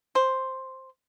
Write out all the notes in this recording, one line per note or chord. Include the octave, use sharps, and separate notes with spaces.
C5